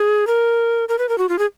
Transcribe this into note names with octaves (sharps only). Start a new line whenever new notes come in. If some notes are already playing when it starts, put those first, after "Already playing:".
Already playing: G#4
A#4
A#4
B4
A#4
F#4
F4
G#4